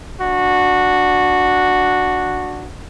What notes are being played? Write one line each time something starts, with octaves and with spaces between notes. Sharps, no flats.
D4 F#4